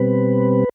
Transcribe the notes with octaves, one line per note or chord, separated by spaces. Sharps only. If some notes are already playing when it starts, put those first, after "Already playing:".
Already playing: B2 G3 C4 B4